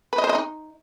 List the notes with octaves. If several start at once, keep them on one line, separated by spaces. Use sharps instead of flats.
B4
D#5
C5
D#5
D#4